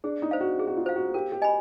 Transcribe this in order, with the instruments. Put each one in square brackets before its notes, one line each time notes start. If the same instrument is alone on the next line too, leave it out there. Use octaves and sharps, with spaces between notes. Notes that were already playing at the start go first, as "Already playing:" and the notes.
[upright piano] D4 [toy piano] G#4
[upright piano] D#4
[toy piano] C5 F5
[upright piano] F#4
[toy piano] G#4
[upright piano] F#4
F4
[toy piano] C5 F5
[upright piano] F#4
[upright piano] G4 [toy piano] A#4
[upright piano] G4
[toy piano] D#5 G#5 B5